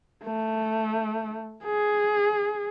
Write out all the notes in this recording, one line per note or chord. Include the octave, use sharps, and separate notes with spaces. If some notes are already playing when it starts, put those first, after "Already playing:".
A3
G#4